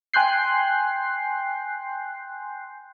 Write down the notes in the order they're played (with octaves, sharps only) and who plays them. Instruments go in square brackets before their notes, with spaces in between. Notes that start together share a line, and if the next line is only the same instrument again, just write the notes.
[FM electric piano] G5 G#5 C6 F#6 G6 C7